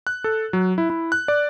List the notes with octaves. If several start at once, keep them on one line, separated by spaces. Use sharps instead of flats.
F#6
A4
F#3
E4
E4
F#6
D5